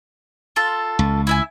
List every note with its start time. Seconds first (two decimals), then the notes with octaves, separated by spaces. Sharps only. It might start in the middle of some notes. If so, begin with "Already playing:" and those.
0.56 F4 A4
0.99 C#2
1.27 E4 E5 G#5